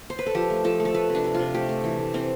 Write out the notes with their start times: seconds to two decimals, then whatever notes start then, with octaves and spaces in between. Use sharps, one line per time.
0.10 C5
0.19 B4
0.26 A4
0.35 F3 G4
0.50 A3
0.64 F3 A4
0.80 A3
0.85 A4
0.94 A3 B4
1.09 C3
1.15 D4
1.24 C3
1.35 C3 F4
1.55 A3 G4
1.69 A3
1.84 E3
1.99 A3
2.14 E3 C4